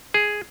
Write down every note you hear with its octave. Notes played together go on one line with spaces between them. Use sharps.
G#4